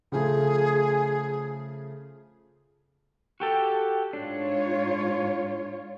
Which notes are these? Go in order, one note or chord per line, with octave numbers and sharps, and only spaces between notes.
C#3 F3 A3 G#4
F#4 G4 A4
G#2 D4 F4 C#5